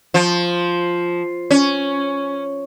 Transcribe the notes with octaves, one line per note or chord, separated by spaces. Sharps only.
F3
C#4